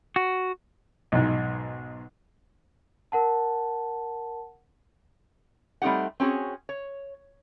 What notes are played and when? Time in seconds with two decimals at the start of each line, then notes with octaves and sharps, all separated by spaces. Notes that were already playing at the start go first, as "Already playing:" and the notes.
0.16 F#4
1.12 B1 G#2
3.12 A#4 F#5 A5
5.82 G3 A3 C4 D#4 G4 F#5
6.20 C4 C#4 F#4 G#4
6.69 C#5